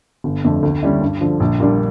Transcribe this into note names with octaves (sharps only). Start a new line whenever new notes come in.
G1
F2 D3 A3
D2
D3 G3 C#4 E4
G2
D3 F3
A#1
A#2 G3 D4